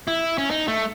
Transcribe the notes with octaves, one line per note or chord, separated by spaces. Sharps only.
E4
C#4
D#4
A3